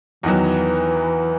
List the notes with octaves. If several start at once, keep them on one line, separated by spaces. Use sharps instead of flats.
E2 D#3 E3 F#3